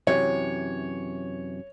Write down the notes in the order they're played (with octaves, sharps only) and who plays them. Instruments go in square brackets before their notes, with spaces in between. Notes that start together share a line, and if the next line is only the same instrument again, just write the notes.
[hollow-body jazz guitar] F#2 C3 E3 [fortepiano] C#5